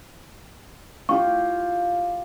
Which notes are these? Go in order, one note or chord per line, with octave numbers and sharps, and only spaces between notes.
F4 G4 C#6